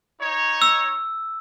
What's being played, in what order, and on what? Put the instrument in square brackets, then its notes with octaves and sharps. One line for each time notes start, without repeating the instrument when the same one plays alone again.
[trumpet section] D#4 C#5
[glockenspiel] E6